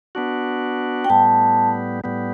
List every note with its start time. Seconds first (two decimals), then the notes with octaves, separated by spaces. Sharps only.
0.15 B3 D4 F#4
1.04 G5
1.10 A2 G3 B3 A5
2.04 A2 G3 B3